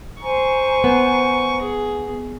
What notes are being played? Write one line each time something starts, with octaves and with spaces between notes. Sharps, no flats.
C5 G#5 A#5 C#6
B3
G#4